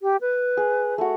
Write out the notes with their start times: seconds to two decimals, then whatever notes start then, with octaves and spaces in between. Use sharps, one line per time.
0.01 G4
0.21 B4
0.57 G#4
0.98 A3 F#4